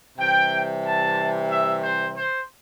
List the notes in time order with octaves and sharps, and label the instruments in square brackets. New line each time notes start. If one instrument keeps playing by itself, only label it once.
[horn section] C3 E3 G3 G5
A5
E5
C5
C5